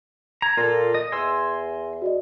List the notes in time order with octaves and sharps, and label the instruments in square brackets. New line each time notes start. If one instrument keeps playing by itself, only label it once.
[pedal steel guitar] A#5 [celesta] G#6
[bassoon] A#2 [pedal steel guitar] F4 A4 [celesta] A#6
[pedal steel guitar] D#5
[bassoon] E2 [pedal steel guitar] G#5 C6 E6
[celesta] F#4 D5 D#5